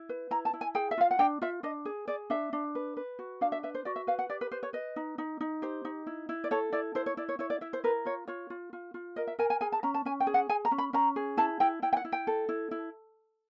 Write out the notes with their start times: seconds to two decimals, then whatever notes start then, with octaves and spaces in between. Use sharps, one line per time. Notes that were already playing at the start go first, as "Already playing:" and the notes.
Already playing: E4
0.09 B4
0.31 E4 A#5
0.45 A5
0.53 E4
0.61 G#5
0.75 G#4 G5
0.91 E5
0.98 F4 F5
1.11 F#5
1.19 D4 G5
1.42 F4 E5
1.63 D4 D#5
1.85 G#4
2.08 G#4 D5
2.30 D4 E5
2.53 D4
2.75 B4
2.97 B4
3.19 F#4
3.41 D4 F5
3.52 E5
3.63 B4 E5
3.75 C5
3.85 F#4 D5
3.96 E5
4.07 B4 F5
4.19 F#5
4.30 G4 D5
4.41 B4
4.52 B4 C5
4.63 C#5
4.73 B4 D#5
4.96 D#4
5.18 D#4
5.41 D#4
5.62 G4 C5
5.85 D#4
6.07 E4
6.29 E4
6.44 D5
6.51 A4 C#5
6.73 E4 D5
6.95 E4 C5
7.06 C#5
7.17 E4 D5
7.29 C#5
7.39 E4 C#5
7.50 D5
7.61 E4 E5
7.73 C5
7.84 A#4 B4
8.05 F4 C#5
8.27 F4 C#5
8.50 F4
8.73 F4
8.94 F4
9.16 A#4 D#5
9.27 E5
9.39 A#4 G#5
9.50 G#5
9.61 G#4 G#5
9.72 A5
9.83 C#4 A#5
9.94 A5
10.05 C#4 G#5
10.20 G5
10.27 G#4
10.34 F#5
10.49 G#4 G#5
10.65 A#5
10.71 C#4
10.78 B5
10.93 C#4 A#5
11.16 G#4
11.37 E4 A5
11.60 E4 G5
11.82 E4 G5
11.93 G5
11.97 F#5
12.05 E4
12.12 G5
12.27 A4
12.49 E4
12.71 E4